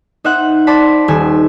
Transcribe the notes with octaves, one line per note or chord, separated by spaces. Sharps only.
D#4 C5 E5 F#5 F#6
C5 D5 A5 B5
D#1 D#3 G#5 E6